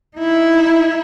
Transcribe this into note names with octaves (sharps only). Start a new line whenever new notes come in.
D#4 E4